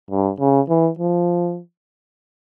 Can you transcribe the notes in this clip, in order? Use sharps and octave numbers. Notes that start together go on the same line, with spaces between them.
G2
C#3
E3
F3